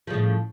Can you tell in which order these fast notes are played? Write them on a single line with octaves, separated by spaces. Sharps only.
F3 C#3 A2